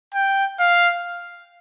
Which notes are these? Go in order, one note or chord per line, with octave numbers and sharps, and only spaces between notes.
G5
F5